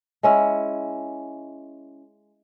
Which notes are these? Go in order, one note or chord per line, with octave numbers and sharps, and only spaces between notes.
G#3 C#4 E4